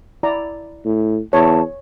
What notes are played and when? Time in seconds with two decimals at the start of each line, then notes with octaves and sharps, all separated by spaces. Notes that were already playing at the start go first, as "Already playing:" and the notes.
0.23 E4 D5 A#5
0.85 A2
1.33 E2 C#5 A5